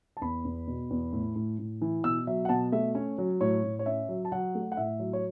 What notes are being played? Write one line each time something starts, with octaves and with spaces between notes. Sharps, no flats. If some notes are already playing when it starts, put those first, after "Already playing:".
A5
E2 B5
E2
B2
E2
A2
A2
A2
E3
B2 E6
F#3 E5
F#5
B2 A5
A3 E5
C#4 C#5
F#3
A2 C#5
A2
C#5
C#4 E5
F#3
A5
F#3 F#5
A3
F#5
A2 E5
F#3
C#5